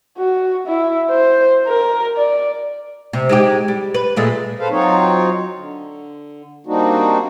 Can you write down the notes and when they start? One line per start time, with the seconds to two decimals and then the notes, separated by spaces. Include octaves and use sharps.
0.18 F#4
0.67 E4
1.11 C5
1.67 A#4
2.17 D5
3.13 C3
3.29 G#3 D#4 G4
3.68 G3
3.94 B4
4.16 A#2 G#3 A3
4.58 A4 B4 C5 F5
4.70 F#3 C4 D#4 F4 C#5
5.57 D3
6.67 G3 A#3 C4 D4 D#4 F#4